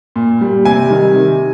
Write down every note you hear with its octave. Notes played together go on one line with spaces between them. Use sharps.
A#2
G3
C3 G#5
D#3 G3
C3